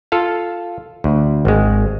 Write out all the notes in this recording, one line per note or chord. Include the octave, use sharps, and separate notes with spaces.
F4 A4 F5
D2
G#1 G#3